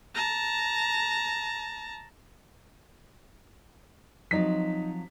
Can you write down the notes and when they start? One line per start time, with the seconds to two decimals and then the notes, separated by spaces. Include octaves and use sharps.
0.14 A5 A#5
4.31 F3 F#3 C4 D#4 B6